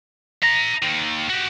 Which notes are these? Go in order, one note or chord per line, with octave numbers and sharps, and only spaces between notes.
E5 A#5 A#6
D#2 D#3
F#4 G4